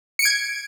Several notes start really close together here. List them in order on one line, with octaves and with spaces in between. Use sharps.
C#7 D7 G#6